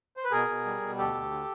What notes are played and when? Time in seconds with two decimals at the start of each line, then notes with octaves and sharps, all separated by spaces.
0.17 C5
0.25 B4
0.31 B2 G#4 A#4
0.49 B2
0.65 G3
0.81 B2
0.98 D2 G4 A4
1.14 D2
1.31 D3